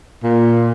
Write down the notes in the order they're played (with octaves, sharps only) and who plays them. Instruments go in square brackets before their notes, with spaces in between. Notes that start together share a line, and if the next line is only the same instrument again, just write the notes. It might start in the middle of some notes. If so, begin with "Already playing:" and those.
[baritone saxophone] A#2